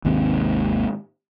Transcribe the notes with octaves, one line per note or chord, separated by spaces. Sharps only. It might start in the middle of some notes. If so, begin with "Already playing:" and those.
G#1 D#2 G#2 C3